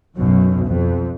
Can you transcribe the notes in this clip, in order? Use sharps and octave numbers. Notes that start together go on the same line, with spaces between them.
B1 F#2 B2
F2